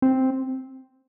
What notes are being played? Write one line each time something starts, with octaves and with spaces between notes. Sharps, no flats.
C4